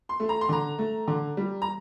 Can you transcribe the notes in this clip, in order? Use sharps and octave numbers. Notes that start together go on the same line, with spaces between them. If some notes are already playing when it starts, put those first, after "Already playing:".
C6
A3
A#5
C6
D3 A#5
A3
D3
G3
A#5